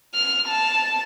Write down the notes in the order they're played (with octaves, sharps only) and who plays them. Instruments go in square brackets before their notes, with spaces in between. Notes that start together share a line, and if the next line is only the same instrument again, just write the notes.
[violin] F6
A5